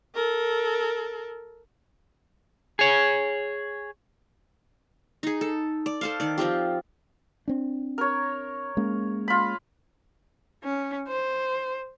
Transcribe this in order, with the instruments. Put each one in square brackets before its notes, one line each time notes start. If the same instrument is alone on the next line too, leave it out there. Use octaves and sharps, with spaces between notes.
[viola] A4 A#4
[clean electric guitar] G#4 C#5
[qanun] D#4 G#4
A4
D5
A4 C5 F5
D#3 D5
F3 C4 F4 G4
[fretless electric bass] C4 D4
[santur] A#4 C#5
[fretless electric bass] G#3 A#3 C#4
[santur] F4 B5
[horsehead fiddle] C#4
C5